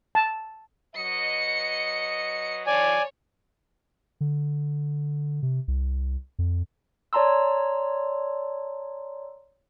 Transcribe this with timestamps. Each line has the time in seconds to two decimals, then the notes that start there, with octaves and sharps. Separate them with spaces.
0.15 A5
0.95 F#3 B4 D#5 C#7
2.67 D3 D#3 F3 C#5 D5 G#5
4.21 D3
5.43 C3
5.68 C2
6.39 F2
7.13 C#5 D5 A5 A#5 C6 E6